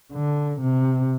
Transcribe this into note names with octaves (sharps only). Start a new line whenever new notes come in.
D3
C3